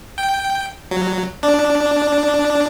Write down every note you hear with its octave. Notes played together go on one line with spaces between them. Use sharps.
G5
F#3
D4